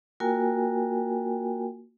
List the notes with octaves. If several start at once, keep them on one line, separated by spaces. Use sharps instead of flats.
A#3 F4 F#4 A#4 G5 G#5